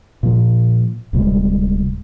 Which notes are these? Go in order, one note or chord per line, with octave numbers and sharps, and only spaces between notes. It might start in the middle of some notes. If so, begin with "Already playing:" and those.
A#2 F3
D1 C3 G3 G#3